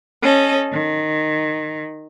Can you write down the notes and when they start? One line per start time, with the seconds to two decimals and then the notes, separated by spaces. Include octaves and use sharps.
0.22 C#4 A4 D#5
0.71 D#3